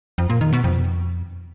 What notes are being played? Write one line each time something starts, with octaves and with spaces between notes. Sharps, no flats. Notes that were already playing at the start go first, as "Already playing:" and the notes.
F2
A#2
D#3
B2
F2